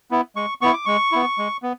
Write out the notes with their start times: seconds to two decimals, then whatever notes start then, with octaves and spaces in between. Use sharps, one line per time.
0.11 B3 E4
0.36 G#3 C#6
0.61 B3 E4 C#6
0.73 D6
0.85 G#3 C#6
1.12 B3 E4
1.38 G#3
1.63 B3